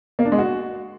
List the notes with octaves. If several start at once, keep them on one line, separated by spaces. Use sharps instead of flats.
A#3
D4
G#3
F#4